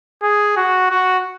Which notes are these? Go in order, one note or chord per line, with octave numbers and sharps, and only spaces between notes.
G#4
F#4
F#4